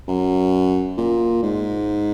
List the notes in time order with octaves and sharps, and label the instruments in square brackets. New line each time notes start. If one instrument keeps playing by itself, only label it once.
[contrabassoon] F#2
A#2
G#2